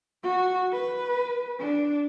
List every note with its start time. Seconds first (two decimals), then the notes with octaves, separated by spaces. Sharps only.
0.23 F#4
0.73 B4
1.59 D4